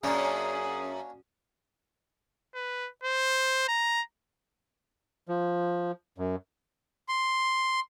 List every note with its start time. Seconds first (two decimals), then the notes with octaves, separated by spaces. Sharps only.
0.03 F#2 A#3 C#4 D4 G#4
2.55 B4
3.04 C5
3.68 A#5
5.28 F3
6.18 F#2
7.08 C6